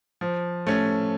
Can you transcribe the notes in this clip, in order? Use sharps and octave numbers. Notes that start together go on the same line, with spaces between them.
F3
A3 C#4